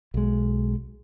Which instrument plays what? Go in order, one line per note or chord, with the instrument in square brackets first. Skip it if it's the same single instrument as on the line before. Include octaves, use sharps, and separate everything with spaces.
[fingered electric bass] B1 G#3